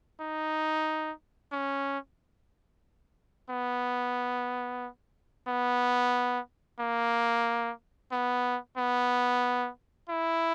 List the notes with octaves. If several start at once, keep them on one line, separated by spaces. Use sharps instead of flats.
D#4
C#4
B3
B3
A#3
B3
B3
E4